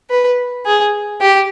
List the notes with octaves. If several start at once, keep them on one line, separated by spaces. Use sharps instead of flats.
B4
G#4
G4